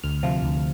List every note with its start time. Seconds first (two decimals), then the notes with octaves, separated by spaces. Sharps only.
0.04 D2 F6
0.23 C3 F3
0.43 D2